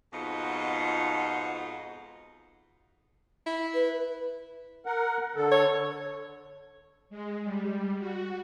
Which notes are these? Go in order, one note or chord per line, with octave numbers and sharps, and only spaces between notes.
F2 G#2 B2 D#4 F4 F#5
E4
B4
A#4 F#5
D3 A4
C#5
G#3
G3
F#4